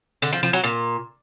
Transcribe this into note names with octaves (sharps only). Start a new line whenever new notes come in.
D3
F3
F3
F#3
A#2